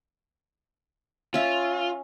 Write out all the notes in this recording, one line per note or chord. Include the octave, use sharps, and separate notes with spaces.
C#4 F4 E5